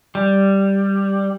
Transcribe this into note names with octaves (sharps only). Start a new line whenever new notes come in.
G3